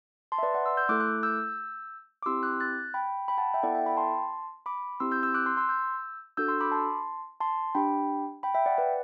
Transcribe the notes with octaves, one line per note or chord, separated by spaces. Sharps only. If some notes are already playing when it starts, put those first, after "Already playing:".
A5 C6
E5
B4 D5
D5 F#5
C6 E6
E6 G6
A3 E4 A4 D6 F#6
D6 F#6
E6 G6
D6
C4 E4 G4 C6 E6
D6 F#6
F#6 A6
G5 B5
G5 B5
F#5 A5
E5 G5
B3 E4 A4 D5 F#5
E5 G5
G5 B5
A5 C6
B5 D6
C4 E4 G4 C6 E6
E6 G6
E6 G6
D6 F#6
C6 E6
C6 E6
E6 G6
D4 F#4 A4 E6 G6
C6 E6
B5 D6
A5 C6
A5 C6
D4 G4 G5 B5
G5 B5
E5 G5
D5 F#5
B4 D5